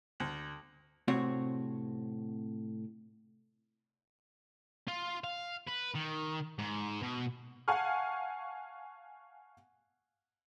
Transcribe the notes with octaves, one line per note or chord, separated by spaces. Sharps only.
D2
A2 C3 C4 F#4 C#5
F4
F5
B4
D#3
G#2
B2
F5 F#5 G#5 A5 C#6 F6